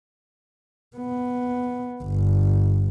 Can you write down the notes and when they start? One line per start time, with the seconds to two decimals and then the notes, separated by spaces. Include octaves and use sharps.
0.97 B3
2.03 G1